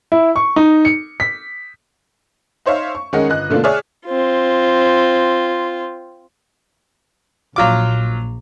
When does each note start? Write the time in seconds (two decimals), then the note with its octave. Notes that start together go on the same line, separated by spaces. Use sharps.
0.12 E4
0.36 C#6
0.56 D#4
0.85 C#7
1.20 B6
2.66 D#4 C5 C#5 E5 F5
2.95 C#6
3.13 D#3 G#3 C#4 A#4 D#5 F#5
3.28 G1 D#5 F#6
3.50 B2 D3 A3 A#3 D4 F4
3.64 G#4 C#5 D5 E5 D#6 F6
4.06 C4 F4
7.56 A#1 F#3 F4 D6